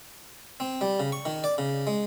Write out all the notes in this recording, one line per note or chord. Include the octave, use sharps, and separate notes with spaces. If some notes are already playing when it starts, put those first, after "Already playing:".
C4
G3
C#3
C#6
D#3
D5
C#3
G#3